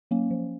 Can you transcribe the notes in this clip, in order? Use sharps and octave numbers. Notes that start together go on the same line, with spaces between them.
F#3 A#3 C#4
F3